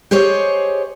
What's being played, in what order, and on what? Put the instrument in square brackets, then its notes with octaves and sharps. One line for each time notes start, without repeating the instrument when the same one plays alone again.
[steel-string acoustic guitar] G4 G#4 C5 C#5 D#5